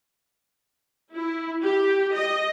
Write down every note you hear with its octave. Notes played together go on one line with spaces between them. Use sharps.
E4
G4
D#5